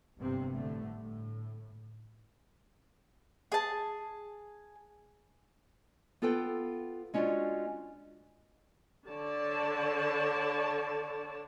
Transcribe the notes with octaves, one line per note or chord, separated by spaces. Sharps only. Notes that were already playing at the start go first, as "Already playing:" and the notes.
G1 G2 C3 C4
A2 D3 A3
A2
G#4 A5
B3 F4 A4 B4 G5
G#3 C#4 D4 F4 F#4
D3 C#5 D5 A5